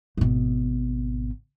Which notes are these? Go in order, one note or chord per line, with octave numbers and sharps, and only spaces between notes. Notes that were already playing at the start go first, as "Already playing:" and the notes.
G#1 B2